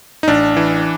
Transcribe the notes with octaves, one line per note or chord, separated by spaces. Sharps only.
D#4
A1 D4
E3